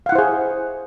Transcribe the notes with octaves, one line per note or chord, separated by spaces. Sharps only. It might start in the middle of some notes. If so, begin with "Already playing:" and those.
E4 G#4 C5 F5 F#5